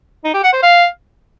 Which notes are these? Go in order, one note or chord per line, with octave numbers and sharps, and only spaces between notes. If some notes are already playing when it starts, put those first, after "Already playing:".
D#4
G4
F#5
C5
F5